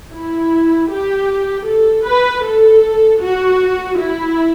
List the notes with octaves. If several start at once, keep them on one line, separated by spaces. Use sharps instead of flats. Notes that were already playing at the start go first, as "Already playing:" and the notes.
E4
G4
A4
B4
A4
F#4
E4